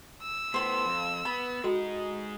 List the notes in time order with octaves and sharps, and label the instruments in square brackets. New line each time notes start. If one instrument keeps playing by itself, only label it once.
[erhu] E6
[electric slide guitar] A2 B3 [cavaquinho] C5 C6
[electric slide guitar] F2
[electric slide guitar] B3 [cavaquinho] B5
[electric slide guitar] G#3 D#4 [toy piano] F#4 A4 G5